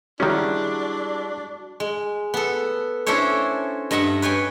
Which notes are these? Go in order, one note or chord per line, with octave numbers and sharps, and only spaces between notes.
D#3 G3 G#3 C#4 D4 E4 F#4
G#3
B3 A4
C#4 D4 E4 A4 C5 C#5
G2 D#5 E5 F#5
B4 C#5 G5 G#5